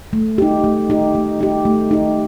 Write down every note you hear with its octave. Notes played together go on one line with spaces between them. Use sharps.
A3
D#4 G4
A3
D#4 G4
A3
D#4 G4
A3
D#4 G4